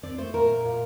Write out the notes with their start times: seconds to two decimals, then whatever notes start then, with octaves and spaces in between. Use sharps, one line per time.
0.03 C4 D5
0.18 A3 C5
0.33 A#2 A#4
0.48 A#2
0.65 A#2